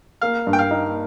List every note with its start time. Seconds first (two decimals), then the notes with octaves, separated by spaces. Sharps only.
0.21 A#3 F5
0.47 G2
0.53 G5
0.59 F5
0.71 D#4